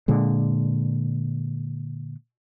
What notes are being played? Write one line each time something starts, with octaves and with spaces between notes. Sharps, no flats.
A#2 D3 G#3